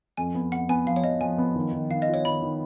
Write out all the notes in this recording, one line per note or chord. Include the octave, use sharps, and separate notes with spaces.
F2 G#5
B3
F2 F#5
B3 G#5
F3 F5
C#5
F3 D#5
F3 G#5
B3
D#3
D#3
D#3 F5
D#5
F4
C#5
D#3 B5
D#3